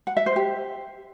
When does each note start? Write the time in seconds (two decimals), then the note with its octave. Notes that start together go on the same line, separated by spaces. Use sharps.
0.07 F#5
0.17 E5
0.26 C5
0.36 G4